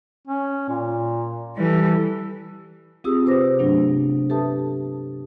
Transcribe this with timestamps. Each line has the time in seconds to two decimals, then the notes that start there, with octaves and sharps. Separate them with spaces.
0.27 C#4
0.69 A#2
1.57 E3 G3 A4
3.04 C4 F4 G4 G#4 D#6 E6
3.26 C3 B4 C5 D6 D#6 A#6
3.59 G2 C3 F#3 A3 B3 D4
4.30 G4 A4 B4 E5 A5 D#6